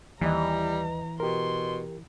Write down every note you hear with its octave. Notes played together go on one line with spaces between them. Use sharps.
D#2 E3 G3 D#5 A#5
B2 G4 A#4 C6